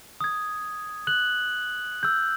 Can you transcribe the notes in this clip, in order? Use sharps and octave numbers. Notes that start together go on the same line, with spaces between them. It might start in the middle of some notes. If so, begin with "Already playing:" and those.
D#6 G#6
F#6 F#7
E6 G6